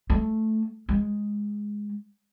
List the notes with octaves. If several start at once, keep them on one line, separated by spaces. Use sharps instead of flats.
A3
G#3